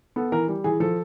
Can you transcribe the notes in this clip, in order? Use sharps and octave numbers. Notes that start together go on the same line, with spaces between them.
B3 A4
E3 A#4
G3
E3 G#4
F3 A4